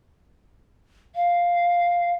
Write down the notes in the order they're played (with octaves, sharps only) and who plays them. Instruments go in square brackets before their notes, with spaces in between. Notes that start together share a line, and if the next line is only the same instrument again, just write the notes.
[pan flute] F5